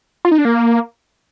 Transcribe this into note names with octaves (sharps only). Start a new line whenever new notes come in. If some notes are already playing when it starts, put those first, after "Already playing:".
F4
D#4
D4
A#3